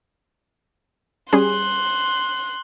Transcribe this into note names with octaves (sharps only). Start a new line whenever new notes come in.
G3 C#4 G#4 C6 F#6